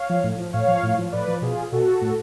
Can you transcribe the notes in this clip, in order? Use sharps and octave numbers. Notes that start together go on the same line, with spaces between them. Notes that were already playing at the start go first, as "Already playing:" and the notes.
Already playing: C#5 F5
F3
A2
F3
A2 C#5 F5
F3
A2
F3
A2 B4 D5
F3
B2 F4 G#4
B2 F#4 A4
A2